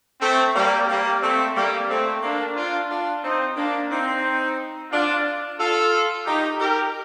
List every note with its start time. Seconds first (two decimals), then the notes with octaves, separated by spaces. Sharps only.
0.20 A3 C4
0.55 G3 A#3
0.87 G3 A#3
1.21 A3 C4
1.55 G3 A#3
1.89 A3 C4
2.22 A#3 D4
2.55 D4 F4
2.89 D4 F4
3.23 C4 D#4
3.56 A#3 D4
3.90 C4 D#4
4.91 D4 F4
5.58 F4 A4
6.25 D#4 G4
6.59 G4 A#4